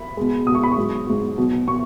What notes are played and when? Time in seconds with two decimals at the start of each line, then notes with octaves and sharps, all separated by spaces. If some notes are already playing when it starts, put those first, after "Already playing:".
Already playing: B5
0.17 B2 G#3
0.46 B2 D#6
0.51 G#3 C#6
0.63 B5
0.72 C#6
0.77 G#2 F#3
1.07 G#2 F#3
1.38 B2 F#3
1.67 B2 C#6